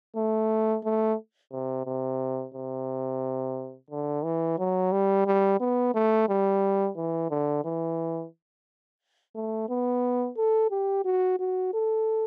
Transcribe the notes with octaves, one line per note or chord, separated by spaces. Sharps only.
A3
A3
C3
C3
C3
D3
E3
F#3
G3
G3
B3
A3
G3
E3
D3
E3
A3
B3
A4
G4
F#4
F#4
A4